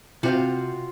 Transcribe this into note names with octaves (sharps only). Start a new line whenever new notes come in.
C3 C4 F4 F#4 F5